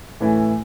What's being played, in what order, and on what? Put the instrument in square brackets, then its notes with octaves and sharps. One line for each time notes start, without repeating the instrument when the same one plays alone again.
[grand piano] A2 E3 A3 C#4 E4